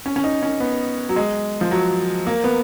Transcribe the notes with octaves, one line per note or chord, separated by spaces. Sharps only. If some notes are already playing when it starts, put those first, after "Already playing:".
C#4
C#4
D#4
C#4
B3
F#3
G#3
F3
F#3
A#3
B3